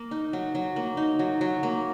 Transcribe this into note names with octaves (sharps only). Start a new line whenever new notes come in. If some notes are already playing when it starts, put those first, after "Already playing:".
Already playing: A#3
D#4
F#3
F#3
A#3
D#4
F#3
F#3
A#3